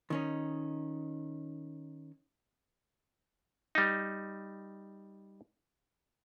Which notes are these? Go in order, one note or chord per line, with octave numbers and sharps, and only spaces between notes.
D#3 C#4 D#4
G3 D#4